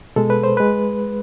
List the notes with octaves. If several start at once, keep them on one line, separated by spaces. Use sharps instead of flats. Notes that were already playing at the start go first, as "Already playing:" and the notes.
B2 G#3 A4
B4
C5
G#3 B4